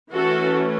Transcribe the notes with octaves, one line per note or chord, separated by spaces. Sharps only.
E3 A3 C#4 F#4 A4